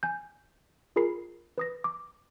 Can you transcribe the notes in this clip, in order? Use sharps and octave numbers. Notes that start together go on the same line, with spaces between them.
G#5 G6
F4 G#4 A#4 B5 C7
B4 D#6 A#6
D6